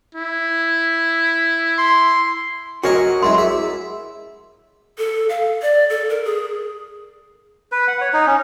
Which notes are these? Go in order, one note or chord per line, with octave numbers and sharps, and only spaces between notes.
E4
C6
F#4 A#4 C#5 D#5 G#5 C6
F#2 G#3 E4 C6
G#4 E5
A4
F5
D5
A4
A#4
G#4
B4
F#5
C#5
D#4
C#4